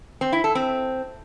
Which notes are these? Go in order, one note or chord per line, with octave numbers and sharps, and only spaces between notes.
C4
E4
A4
C4